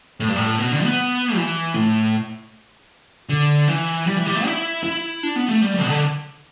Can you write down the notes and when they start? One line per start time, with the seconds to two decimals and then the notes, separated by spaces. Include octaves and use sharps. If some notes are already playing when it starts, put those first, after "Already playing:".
0.20 A2
0.28 G2
0.36 A2
0.58 B2
0.71 D3
0.84 B3
1.36 E3
1.74 A2
3.29 D3
3.68 E3
4.07 G3
4.16 E3
4.26 G3
4.35 A3
4.46 E4
4.84 E4
5.23 D4
5.36 B3
5.49 A3
5.62 G3
5.75 G3
5.81 B2
5.87 D3